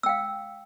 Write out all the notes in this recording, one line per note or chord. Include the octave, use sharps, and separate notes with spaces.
F5 G5 E6